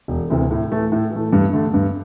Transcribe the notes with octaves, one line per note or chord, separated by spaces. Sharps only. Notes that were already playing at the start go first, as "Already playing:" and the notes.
E1
D2 C3 E3
A2
E3 A3
A2
E3 A3
G2
D3 A3
G2